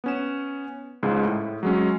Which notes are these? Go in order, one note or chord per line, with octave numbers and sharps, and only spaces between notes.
B3 C#4 E7
C#2 G#2 C#3
A2
F#3 G#3 C#4